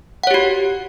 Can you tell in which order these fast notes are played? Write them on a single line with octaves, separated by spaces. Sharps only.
F#5 C#5 G4 F#4